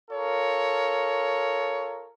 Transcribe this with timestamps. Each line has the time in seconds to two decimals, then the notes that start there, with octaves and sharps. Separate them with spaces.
0.11 F4 A4 A#4 C#5